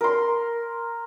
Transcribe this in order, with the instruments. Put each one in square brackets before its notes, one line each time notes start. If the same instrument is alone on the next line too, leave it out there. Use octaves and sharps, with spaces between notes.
[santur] A#4 C6